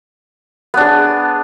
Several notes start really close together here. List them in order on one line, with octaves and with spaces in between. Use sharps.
B3 D4 G#4